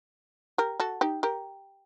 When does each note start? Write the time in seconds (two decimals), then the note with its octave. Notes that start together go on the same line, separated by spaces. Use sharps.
0.58 G4 A#4
0.80 F#4 A4
1.01 D#4 G4
1.23 G4 A#4